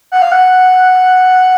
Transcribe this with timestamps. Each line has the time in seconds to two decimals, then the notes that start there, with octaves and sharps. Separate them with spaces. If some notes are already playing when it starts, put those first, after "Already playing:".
0.12 F#5
0.22 F5
0.32 F#5